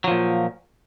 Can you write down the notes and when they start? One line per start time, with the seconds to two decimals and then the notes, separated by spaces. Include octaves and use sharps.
0.04 F#3
0.08 F3
0.11 A#2